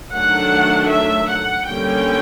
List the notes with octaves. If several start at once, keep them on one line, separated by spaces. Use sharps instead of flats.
D#3 F#3 A3 D4 F#5
E5
F#5
D3 G3 A#3 C#4 G5